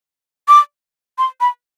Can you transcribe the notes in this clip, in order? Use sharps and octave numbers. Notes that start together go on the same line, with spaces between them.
D6
C6
B5